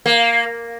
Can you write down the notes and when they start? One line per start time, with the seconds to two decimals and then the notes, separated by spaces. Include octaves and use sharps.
0.06 A#3